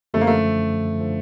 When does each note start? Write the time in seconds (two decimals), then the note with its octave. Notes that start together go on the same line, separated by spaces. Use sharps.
0.14 F#2 D3 F3 A3
0.21 A#3
0.27 A3
1.00 D3 F3